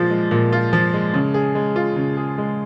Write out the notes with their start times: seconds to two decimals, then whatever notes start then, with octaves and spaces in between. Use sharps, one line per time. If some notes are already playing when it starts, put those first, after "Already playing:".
Already playing: A#2 F3 G#3 F4
0.10 G#3
0.31 A#2
0.52 F4
0.73 F3
0.94 G#3
1.14 C#3
1.34 G#4
1.55 G#3
1.76 F4
1.96 C#3
2.17 G#4
2.38 G#3